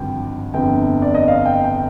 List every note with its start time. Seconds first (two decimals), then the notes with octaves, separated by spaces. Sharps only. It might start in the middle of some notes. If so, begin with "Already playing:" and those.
Already playing: G#1 G2 D3 F3 G5
0.54 G1 F2 D3 G5
1.02 D5
1.15 D#5
1.28 F5
1.45 G5
1.64 G5